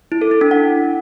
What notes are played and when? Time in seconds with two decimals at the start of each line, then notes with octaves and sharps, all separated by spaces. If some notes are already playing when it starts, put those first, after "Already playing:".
0.12 E4
0.22 A4
0.31 E4
0.41 D4
0.51 F#5